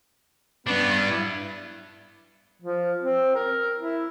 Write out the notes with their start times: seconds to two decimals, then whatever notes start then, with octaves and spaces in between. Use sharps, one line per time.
0.67 G2 B3 D4
1.09 E4
2.62 F3
3.02 C4
3.35 A#4
3.77 E4